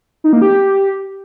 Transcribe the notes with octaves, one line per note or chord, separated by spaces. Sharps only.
D#4
A#3
G4